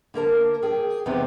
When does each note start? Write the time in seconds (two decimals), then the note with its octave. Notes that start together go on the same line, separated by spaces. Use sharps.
0.14 D3 A#3 A#4 A5
0.62 G#4 G5
1.06 E2 C3 B3 C4 D#4